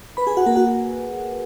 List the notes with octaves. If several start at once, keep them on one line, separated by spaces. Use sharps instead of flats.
B4 B5
G#4 G#5
F#4 F#5
A#3 A#4
F#4 F#5